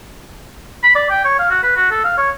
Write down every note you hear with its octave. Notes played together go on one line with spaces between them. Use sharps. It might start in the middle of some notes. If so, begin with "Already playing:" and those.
B5
D5
G5
C#5
F5
F#4
B4
F#4
A4
F5
C#5